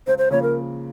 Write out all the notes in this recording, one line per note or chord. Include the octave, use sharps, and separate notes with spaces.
C#2 C5
C5
C#3 F3 A#3 C#5
A#4